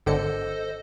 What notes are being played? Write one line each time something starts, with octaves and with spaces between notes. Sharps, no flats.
G#1 D3 A4 C5 D#5 C#7